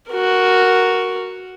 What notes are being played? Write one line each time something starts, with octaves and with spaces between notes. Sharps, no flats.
F#4 A#4